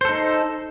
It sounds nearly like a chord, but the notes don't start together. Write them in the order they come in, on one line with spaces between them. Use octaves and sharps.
C5 A4 D#4